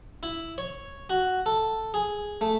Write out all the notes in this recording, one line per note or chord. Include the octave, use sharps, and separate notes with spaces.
E4
C#5
F#4
A4
G#4
A3